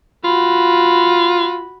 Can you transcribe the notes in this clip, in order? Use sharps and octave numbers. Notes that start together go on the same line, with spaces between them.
F4 F#4 B5